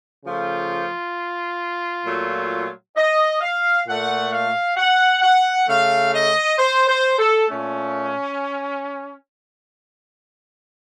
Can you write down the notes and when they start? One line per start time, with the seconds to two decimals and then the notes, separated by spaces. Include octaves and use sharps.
0.25 C#3 F3 A3 F4
2.05 A#2 F#3 A3
2.96 D#5
3.41 F5
3.86 A#2 A3 F#5
4.32 F5
4.77 F#5
5.22 F#5
5.67 C#3 A3 F5
6.13 D#5
6.58 C5
6.88 C5
7.18 A4
7.49 A#2 A3 C#4